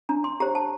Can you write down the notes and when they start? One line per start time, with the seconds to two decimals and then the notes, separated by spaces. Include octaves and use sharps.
0.09 D4 A#5
0.24 C6
0.40 G4 C5 A#5
0.55 A5